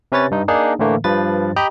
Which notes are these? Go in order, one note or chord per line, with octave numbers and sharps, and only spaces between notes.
C3 C#4 B4 C#5 A6
G2 D#4
A#3 D4 D#4 G#4
A2 D3 E3 A3 A#3
G2 F3 B4 A6
G4 D#5 G5 A#5 B5